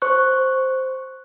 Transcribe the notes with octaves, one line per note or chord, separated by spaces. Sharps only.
C5 C#6 F#6